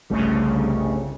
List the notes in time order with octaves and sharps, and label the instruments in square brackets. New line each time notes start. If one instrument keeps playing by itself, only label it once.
[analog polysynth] G1 C2 C#3 [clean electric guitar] G3 A3 G4